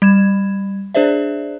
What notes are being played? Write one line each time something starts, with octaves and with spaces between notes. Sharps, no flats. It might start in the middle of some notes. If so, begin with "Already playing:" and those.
G3 G#6 E7
D4 G#4 C5 D5 E5